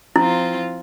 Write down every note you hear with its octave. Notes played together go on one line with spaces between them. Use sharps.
F3 C4 E4 F4